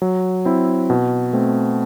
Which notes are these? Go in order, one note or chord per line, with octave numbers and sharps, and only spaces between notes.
F#3
C4 E4
B2
A3 C4